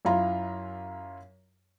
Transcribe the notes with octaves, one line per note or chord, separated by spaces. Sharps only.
F#2 E4 F4 A#5